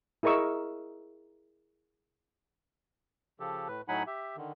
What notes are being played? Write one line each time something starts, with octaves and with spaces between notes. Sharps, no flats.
E4 G#4 A#4 D#5 C#6 E6
C#3 F3 G4 A4
A2 B4
A2 F#3 D#4 F#5 G#5 B5
G4 E5
D3 D#3